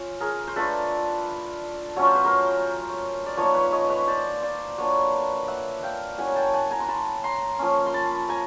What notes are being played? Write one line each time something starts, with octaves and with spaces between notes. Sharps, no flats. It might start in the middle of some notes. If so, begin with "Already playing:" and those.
Already playing: C#4 F4
G#4 A#4
C5
A3 D4 F4 A4 B4
F#3 A3 C#4 F4 C#5
C5
B4
A#4 C5
D5
F3 A#3 D#4 B4 C#5
B4 C#5
C#5 D#5
B4 C#5
C5 D5
C5 D5
F#3 A#3 D4 F4 B4 C#5
E5 F#5
F5 G5
F#3 A#3 C#4 E4 F#5 G#5
G5 A5
F#5 G#5
G#5 A#5
C6
A5 B5
A#5 C6
F3 A#3 C#4
C6
A5 B5
G#5 A#5